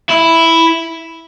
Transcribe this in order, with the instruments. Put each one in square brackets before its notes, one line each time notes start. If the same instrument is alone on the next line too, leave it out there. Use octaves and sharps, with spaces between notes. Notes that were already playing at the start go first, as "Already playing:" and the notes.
[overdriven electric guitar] E4